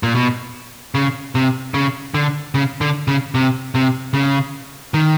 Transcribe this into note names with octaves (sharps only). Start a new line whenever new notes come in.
A#2
B2
C#3
C3
C#3
D3
C#3
D3
C#3
C3
C3
C#3
D#3